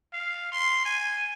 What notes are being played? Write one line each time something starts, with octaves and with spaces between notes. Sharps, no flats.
F5
C6
G#5